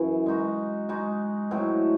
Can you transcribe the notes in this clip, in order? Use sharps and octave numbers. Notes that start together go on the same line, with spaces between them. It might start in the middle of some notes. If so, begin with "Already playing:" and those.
Already playing: F#2 C#3 E3
G#3 D#4 F#4
G#3 D#4 F#4
A2 F#3 C4 F#4